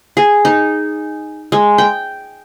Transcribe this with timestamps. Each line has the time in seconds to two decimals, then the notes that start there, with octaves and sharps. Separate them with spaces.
0.17 G#4
0.45 D#4
1.52 G#3
1.78 G5